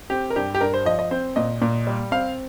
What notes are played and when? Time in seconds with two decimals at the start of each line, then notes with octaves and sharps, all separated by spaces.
0.10 C4 G4
0.30 A#4
0.36 G2 G4
0.55 G4
0.61 G2 A#4
0.74 C5
0.85 F3 D#5
0.99 D#5
1.11 C4 C5
1.36 A#2 D#5
1.62 A#2
1.87 G3
2.11 C4 F5